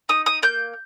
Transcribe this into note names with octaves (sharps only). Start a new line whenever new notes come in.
D#4 D#6
D#6
A#3 G6